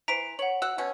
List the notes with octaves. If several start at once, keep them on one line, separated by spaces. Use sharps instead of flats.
E3 C5 A#5 B6 D7
C#5 F#5 F#7
F#4 F#5 E6
B2 C#4